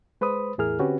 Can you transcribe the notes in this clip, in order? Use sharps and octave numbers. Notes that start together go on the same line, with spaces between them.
G#3 B4 C5 B5 D#6
E2 A2 E4 G#4 A#4 F6
D3 C4 C#4 F#4 G4 B4